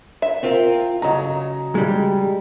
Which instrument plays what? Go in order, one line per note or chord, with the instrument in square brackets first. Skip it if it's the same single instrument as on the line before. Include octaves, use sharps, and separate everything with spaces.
[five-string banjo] E5
[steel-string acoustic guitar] C4 F4 A#4
[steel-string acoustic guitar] C#3 F#3 [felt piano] D#5 A#5
[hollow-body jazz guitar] G3 G#3